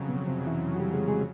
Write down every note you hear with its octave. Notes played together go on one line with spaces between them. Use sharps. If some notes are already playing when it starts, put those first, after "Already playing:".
Already playing: F2 C#3 F#3
B2 B3
C3 C4
E3 E4
F#4
G3 G4
G#3 G#4
G#3 G#4